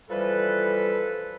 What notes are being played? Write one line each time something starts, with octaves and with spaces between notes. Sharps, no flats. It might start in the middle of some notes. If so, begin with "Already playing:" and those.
E3 F3 G3 A4 B4